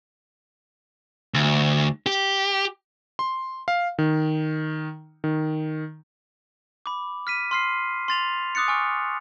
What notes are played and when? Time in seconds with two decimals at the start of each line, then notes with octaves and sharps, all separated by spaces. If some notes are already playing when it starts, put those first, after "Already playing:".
1.34 D2
2.06 G4
3.19 C6
3.68 F5
3.99 D#3
5.24 D#3
6.86 B5 D6
7.27 F6 B6 D#7
7.51 C6 F6 C7
8.08 C6 A6 F7
8.55 D6 D#6 F#6 A6 C#7
8.68 G#5 C#6 F6